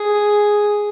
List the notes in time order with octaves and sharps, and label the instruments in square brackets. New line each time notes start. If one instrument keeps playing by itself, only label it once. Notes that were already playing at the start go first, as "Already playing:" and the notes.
Already playing: [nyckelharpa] G#4